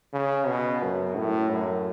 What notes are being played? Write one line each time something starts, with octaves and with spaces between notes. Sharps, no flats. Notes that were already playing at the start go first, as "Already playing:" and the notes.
C#3
B2
F#2
A2
F#2